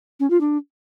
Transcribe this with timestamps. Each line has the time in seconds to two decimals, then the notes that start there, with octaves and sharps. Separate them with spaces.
0.20 C#4
0.30 F4
0.41 D4